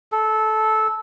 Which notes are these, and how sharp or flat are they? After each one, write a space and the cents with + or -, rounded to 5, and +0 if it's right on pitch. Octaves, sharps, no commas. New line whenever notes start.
A4 -15